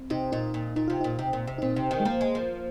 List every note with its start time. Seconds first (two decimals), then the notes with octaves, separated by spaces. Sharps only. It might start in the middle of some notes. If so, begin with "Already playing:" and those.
Already playing: C4
0.10 C3 D#4
0.32 A#2 D#4
0.54 A#2
0.76 A#2 D#4
0.88 C3 F4
1.01 D#4
1.04 A#2
1.19 C3 D#4
1.33 A#2
1.47 C3
1.58 D#4
1.62 A#2 C4
1.76 C3
1.91 D#3
2.00 G#3
2.05 F3 A#3
2.21 G#3
2.35 F3